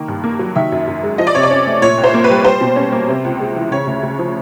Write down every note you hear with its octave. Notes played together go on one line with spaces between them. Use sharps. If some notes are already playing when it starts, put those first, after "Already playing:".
Already playing: D#3 A#3
G2
A#3
F#3
D#3 E5
F#2
F#2
G#3
F3 D#5
D5
C3 C#5
D5
C#4
A3
A#2 C#5
C2
C5
A#3
B4
G3
G3 C5
B2
C#4
A#3
C3
C#2
G#3
E3
C#3 C#5
D2
D2
F3